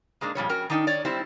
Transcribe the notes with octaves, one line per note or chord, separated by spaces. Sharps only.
G#2 G#3 A#3 D4
F2 A#2 G3 C#5
C#4 F#4 A#4 G5
D#3 D4 D#4 F5 G5
C#5 D5
G3 C4 E4 G4 C5